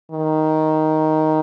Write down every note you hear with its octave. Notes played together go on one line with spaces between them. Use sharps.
D#3